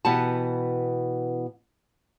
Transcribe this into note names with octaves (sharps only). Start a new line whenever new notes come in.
B2 E3 B3 G4 F#5 A5